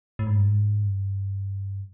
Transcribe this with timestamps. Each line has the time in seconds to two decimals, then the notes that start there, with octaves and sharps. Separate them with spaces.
0.19 A2
0.27 G#2
0.35 G2
0.43 G#2
0.83 G2